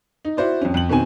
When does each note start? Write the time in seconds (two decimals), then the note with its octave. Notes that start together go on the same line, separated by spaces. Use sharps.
0.25 D#4
0.37 E4 F#4 C5 D5
0.61 F2 C#4
0.74 F2 F#7
0.89 B2 D#3 C4 G#5